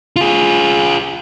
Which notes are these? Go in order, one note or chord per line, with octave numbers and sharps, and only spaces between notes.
F4 G#4